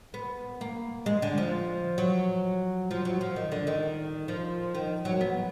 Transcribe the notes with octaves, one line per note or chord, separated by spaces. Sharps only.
B3
A#3
G#3
D3
F3
F#3
F3
F#3
F3
D#3
D3
D#3
F3
D#3
F#3
B3